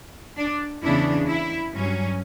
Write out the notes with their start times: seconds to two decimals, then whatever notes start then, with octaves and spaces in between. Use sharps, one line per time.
0.37 D4
0.82 E2 C#3 E3 B3 D4 E4
1.27 E4
1.72 G2 F#3 C#4